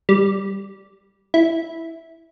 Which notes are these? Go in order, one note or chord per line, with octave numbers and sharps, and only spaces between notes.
G3
E4